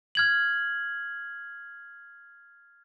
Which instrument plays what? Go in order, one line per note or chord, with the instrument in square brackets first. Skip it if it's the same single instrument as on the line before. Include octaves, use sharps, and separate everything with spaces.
[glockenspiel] F6 G#6 F#7